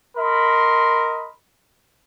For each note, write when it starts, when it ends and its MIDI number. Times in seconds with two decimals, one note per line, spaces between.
0.17 1.31 70
0.17 1.31 75
0.17 1.31 83
0.17 1.31 84